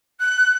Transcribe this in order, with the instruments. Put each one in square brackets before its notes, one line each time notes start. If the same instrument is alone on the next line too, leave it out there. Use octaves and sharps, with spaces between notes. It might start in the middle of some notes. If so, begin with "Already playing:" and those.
[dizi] F#6